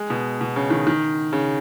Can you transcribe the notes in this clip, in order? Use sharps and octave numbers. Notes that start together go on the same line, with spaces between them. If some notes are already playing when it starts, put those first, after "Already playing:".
Already playing: G#3
B2
B2
C#3
D#3
D#3
C#3